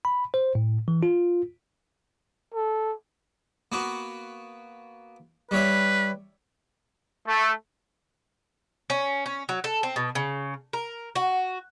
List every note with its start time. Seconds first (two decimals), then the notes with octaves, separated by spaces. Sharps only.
0.05 B5
0.34 C5
0.55 A2
0.88 E3
1.03 F4
2.54 A4
3.72 A#3 B3 F#4
5.51 G3 B4 C#5 E5
7.29 A3
8.90 C#4
9.26 C#4
9.49 F#3
9.64 A4
9.83 C4
9.96 B2
10.15 C#3
10.73 A#4
11.15 F#4